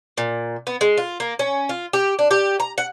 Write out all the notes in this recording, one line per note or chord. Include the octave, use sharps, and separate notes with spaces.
A#2
B3
G#3
F4
A#3
C#4
F4
G4
D4
G4
A#5
F#5